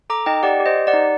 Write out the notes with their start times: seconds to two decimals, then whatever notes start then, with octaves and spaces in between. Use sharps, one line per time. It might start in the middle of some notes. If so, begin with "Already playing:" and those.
0.10 A4 A#5 D6
0.26 D#4 D#5 G5
0.43 G4 D5 F#5
0.60 G4
0.66 C5 D#5
0.76 G4
0.87 D5 F#5
0.93 D#4